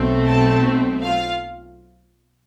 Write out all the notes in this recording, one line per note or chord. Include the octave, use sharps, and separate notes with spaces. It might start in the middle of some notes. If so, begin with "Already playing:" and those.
Already playing: B1 B2 A3 C4
A4 A5
F4 F5